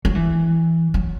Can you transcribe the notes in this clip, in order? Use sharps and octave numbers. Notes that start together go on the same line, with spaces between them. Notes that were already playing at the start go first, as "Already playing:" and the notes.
F#3
E3
F#3